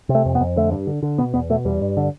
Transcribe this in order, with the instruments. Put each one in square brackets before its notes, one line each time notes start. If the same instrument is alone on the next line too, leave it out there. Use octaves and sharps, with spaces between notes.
[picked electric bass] C3
A3
F2
B3
F2
D3 A3
G2
D3
D3
B2 B3
E2 B3
B2 A3
E2 G3
G2
D3